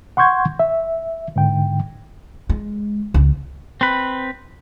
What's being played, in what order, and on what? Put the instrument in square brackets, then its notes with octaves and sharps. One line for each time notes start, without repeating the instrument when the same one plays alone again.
[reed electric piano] F#5 C6 C#6 G6 G#6
E5
G#2 D3 G5
[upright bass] G#3
C#2
[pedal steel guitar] C4 B4